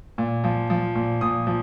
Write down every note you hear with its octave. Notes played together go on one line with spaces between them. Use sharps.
A#2
F3
F3
A#2
A#2 D#6
F3